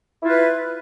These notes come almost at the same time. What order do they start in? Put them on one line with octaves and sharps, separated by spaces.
E4 F4 B4